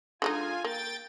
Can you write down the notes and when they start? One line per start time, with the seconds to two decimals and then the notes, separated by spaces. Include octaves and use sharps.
0.22 D3 G#3 D#4 F4 G#5
0.64 A#3 G5 A6